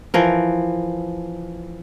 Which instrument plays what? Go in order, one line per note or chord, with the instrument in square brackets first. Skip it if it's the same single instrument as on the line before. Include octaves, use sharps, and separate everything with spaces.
[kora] E3 F3 A#4